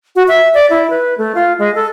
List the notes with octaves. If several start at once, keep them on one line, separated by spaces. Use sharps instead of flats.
F#4
E5
D5
E4
B4
A3
F4
G#3
A4